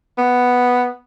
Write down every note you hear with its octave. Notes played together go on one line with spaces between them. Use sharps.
B3